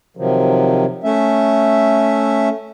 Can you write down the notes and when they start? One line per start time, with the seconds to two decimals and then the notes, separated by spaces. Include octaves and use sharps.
0.17 C3 D#3 F3 F#3
1.04 A3 C#4 E5